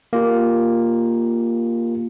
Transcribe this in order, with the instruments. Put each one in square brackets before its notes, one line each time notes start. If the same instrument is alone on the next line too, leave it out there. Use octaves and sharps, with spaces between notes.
[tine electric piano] A#3 F4 G4